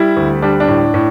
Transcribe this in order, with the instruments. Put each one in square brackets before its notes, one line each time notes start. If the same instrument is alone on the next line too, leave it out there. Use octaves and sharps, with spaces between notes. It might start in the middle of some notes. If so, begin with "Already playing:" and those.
Already playing: [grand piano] G3 E4
D2
G3 D4
D4
A2
A2